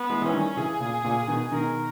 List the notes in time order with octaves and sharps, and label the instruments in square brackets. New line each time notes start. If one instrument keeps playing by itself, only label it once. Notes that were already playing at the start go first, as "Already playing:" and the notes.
Already playing: [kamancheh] B3
[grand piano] E3 G#3
[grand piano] E3 [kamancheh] C#4
[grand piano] D#3 G3
[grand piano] C#3 E3 [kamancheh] G#4
[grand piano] A#2 C#3
A#2 C#3
B2 D#3
[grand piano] B2 D#3 [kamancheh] A#4